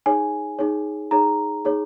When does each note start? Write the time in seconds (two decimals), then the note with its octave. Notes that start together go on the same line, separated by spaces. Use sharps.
0.06 D#4 G#4 C#5 G#5
0.59 D#4 G#4 C#5
1.11 D#4 G#4 C#5 A#5
1.65 D#4 G#4 C#5